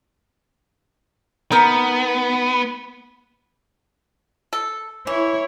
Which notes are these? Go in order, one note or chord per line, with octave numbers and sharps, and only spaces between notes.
B3 D#4 A#4 A#5
A4
E3 E4 C#5